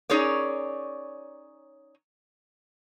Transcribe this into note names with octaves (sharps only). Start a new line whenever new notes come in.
C#4 D#4 G#4 A#4 C#5 D5